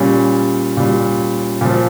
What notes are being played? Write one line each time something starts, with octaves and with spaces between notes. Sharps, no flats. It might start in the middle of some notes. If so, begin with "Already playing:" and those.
Already playing: A#2 G3 C#4
A#2 G3
A#2 F3